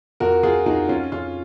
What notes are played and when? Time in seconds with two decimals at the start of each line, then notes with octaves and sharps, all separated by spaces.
0.20 F2 F#4 A#4
0.43 F2 F4 G#4
0.66 F2 D#4 F#4
0.89 F2 C#4 F4
1.12 F2 C#4 F4